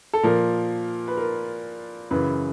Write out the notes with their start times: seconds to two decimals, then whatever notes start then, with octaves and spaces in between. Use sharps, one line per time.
0.13 A4
0.23 A#2 F3 A#4
1.08 B4
1.17 A#4
2.11 F#2 C#3 E3 B4